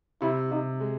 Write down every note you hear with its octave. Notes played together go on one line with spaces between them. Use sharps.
C3 E4
C3 D#4
G#3